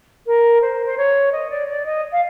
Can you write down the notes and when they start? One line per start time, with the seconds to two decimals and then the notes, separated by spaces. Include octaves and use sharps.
0.27 A#4
0.62 C5
0.86 C5
0.97 C#5
1.32 D#5
1.50 D5
1.68 D5
1.86 D#5
2.12 F5